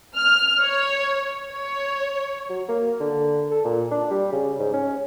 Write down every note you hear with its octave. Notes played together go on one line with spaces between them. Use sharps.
F6
C#5
C#5
F#3
A#3
D3
A4
A#2
D4
G3
C#3
G#2
C#4